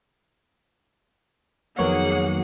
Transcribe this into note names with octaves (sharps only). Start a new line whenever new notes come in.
F2 D#3 F#3 A#3 B3 G#4 C#5 F#5